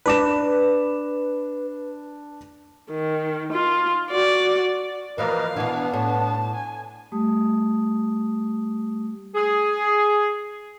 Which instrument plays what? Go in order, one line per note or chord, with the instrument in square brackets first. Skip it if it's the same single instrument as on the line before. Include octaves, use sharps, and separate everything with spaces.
[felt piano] D4 D6 E7 [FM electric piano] B4
[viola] D#3
F4
F#4 D5
[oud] E3 F3 A#3 [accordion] A#4 B4 D#5 [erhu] F5
[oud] B2 E3 [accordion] B3 D4
[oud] A2 [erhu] A5
[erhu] G#5
[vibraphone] G3 A3 G4 D#6
[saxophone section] G#4